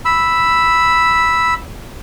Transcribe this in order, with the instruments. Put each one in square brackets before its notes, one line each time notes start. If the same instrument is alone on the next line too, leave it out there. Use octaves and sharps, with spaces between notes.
[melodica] B5 E6